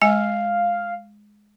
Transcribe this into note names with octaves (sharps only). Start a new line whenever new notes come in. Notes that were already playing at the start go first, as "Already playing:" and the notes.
G#3 F5 G#5